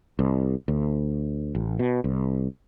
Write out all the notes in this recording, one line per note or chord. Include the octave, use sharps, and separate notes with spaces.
C2
D2
A1
B2
C2